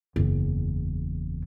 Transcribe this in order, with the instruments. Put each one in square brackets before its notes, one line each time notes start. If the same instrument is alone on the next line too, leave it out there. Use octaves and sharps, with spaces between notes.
[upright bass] F#1 E2